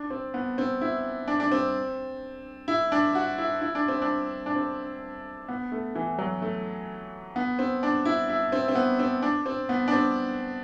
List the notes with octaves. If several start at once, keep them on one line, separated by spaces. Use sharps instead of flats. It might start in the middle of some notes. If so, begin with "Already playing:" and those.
Already playing: D4
C4
B3
C4
E4
D4
D4
C4
E4
D4
F#4
E4
E4
D4
C4
D4
D4
C4
B3
A3
E3
F#3
A3
B3
C4
D4
E4
E4
C4
C4
B3
C4
D4
C4
B3
D4
C4